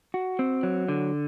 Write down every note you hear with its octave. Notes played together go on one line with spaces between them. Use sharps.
F#4
C4
F#3
D3